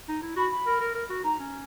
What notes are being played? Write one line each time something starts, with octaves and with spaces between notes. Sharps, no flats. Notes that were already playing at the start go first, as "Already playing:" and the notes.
D#4
E4
F#4 B5
B5
A#4
A#4
A#4
F#4
D#4 A#5
C#4